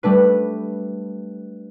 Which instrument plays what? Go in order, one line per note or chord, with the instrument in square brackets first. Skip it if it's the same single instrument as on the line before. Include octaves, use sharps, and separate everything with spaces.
[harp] G3 A3 D4 B4